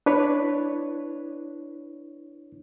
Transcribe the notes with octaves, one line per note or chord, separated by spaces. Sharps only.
D4 E4 B4 C#5